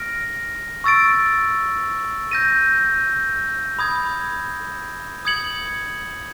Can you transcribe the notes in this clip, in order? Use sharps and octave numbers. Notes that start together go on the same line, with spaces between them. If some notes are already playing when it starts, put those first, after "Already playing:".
Already playing: F6 A#6 D7
C#6 E6 A6 D7
G6 A#6 D#7
B5 D#6 G#6
D#6 G#6 C#7 F#7